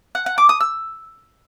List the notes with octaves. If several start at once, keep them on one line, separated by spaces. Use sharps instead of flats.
F#5
F#5
D6
D#6
E6